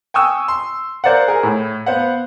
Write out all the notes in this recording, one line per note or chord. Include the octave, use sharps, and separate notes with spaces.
G5 G#5 C#6 D#6 E6
C6
A#4 C5 D5 F5 F#5
G#4 A#4
A2
B3 C5 F5 F#5